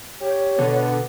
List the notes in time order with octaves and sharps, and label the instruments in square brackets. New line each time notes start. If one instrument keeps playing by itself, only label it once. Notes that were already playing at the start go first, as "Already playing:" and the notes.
[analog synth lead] G4 [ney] C#5
[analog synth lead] B2 [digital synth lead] D3 [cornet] B3